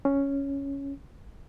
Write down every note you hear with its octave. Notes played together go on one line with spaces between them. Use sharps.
C#4